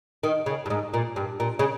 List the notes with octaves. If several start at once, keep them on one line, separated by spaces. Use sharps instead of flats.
D#3
C#3
G2
G#2
A#2
G2
A#2
C#3